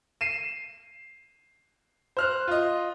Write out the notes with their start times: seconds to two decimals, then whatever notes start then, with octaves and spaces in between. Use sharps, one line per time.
0.21 C7 D#7 E7
2.17 C5 F6 F#6
2.48 F4 D#5